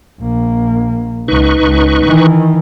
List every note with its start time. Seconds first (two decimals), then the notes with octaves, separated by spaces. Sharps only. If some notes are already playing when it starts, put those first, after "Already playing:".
0.20 A#1 A#3
1.28 C#2 D#4 B4 C#6
1.64 C#2
2.05 D#3 E3